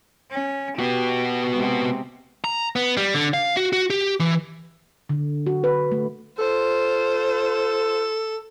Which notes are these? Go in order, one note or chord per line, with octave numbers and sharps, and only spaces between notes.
C#4
B3 F#4 G4
C3 G#3
A#5
B3
G3
D3
F5
F#4
F#4
G4
E3
D3
F#4
B4
A3
F4 A4 C5